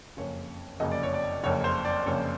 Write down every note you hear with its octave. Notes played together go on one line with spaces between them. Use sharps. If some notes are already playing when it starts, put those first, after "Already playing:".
F#1 F2 C#3 C#5
F#1 F2 C#3 D#5
D5
C#5
D5
F#1 F2 C#3 C#5
C5
D5
F#1 F2 C#3 C#5